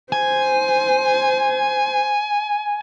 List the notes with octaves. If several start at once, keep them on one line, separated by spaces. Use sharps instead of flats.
C5 G#5